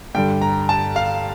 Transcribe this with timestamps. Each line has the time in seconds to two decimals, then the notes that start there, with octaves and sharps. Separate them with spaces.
0.15 G2 D3 G3 G5
0.41 A#5
0.69 A5
0.96 F5